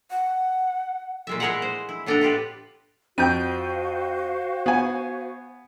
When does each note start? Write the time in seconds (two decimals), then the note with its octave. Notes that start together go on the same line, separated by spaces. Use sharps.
0.11 F#5
1.27 A#2 G#3 E5
1.40 G#3 E4 G#4 A#4 F5 F#5
1.62 C5
1.89 E4
2.06 A2 B3 D4 E4 D#5 A#5
2.21 D4 F4 G4 B4
3.18 F2 F#4 C5 F5 G5 G6 D#7
4.66 B3 G#5